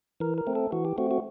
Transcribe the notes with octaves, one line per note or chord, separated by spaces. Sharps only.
E3 A#4
A#4
A3 C4
A4
E3 F#4
G4
A3 C4 F#4
F#4